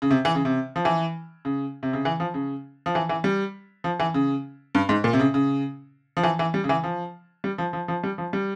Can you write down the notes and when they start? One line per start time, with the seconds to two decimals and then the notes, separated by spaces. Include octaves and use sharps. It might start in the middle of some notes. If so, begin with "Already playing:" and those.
0.02 C#3
0.11 C3
0.25 E3
0.35 C#3
0.45 C3
0.76 F3
0.85 E3
1.45 C#3
1.83 C3
1.93 C#3
2.05 E3
2.20 F3
2.34 C#3
2.86 F3
2.95 E3
3.09 E3
3.24 G3
3.84 F3
4.00 E3
4.14 C#3
4.75 G2
4.89 G#2
5.04 A#2
5.13 C3
5.20 C#3
5.34 C#3
6.17 F3
6.23 E3
6.39 E3
6.54 G3
6.64 C#3
6.69 E3
6.84 F3
7.44 G3
7.58 F3
7.73 F3
7.88 F3
8.04 G3
8.18 F3
8.33 G3